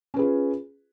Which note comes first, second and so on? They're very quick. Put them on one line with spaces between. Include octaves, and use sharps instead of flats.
C#4 B4 G#4 F4